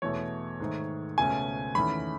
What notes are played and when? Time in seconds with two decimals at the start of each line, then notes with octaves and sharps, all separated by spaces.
0.02 E2 B2 A3 C#5
0.60 G#2 D#3 A3
1.18 C#2 B2 A3 C#4 G#5
1.75 E2 D#3 A3 C#4 B5